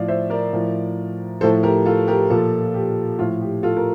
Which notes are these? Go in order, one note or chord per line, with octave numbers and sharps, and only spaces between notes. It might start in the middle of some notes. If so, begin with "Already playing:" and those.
Already playing: A2 F3 D5 F5
C5 E5
A#4 D5
A2 F3
A2 F3 A4 C5
G4 A#4
F4 A4
G4 A#4
A#2 F3 F4 A4
G4
A2 F3 F4
G4
F4 A4
A#4